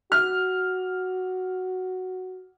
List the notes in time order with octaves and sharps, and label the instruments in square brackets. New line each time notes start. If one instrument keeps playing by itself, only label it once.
[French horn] F#4 [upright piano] F6